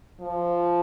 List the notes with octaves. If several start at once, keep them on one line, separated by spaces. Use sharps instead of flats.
F3